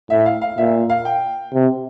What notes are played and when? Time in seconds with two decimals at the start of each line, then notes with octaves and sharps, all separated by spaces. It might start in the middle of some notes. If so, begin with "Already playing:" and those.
0.10 A2 E5
0.26 F5
0.41 F5
0.58 A#2 E5
0.90 F5
1.05 G5
1.53 C3